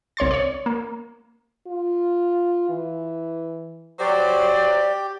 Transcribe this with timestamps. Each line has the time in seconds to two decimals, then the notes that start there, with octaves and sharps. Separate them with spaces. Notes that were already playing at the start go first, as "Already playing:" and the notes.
0.17 C2 C#5 C6 A6
0.31 C#5 D5
0.66 A#3
1.67 F4
2.69 E3
3.99 F#3 F#4 G4 C5 D5